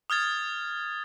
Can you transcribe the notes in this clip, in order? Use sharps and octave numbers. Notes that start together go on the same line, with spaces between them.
D#6 F6 G#6 A6